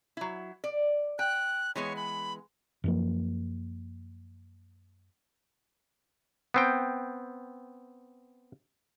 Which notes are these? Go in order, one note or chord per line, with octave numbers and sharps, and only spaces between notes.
F#3 E4
D5
G5 F#6
E3 G#3 B3 C#5
B5
F#2 F3 A#3
B3 C4 G5